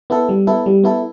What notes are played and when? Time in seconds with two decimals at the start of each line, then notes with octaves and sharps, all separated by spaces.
0.10 B3 E4 A4
0.29 G3
0.47 B3 E4 A4
0.66 G3
0.84 B3 E4 A4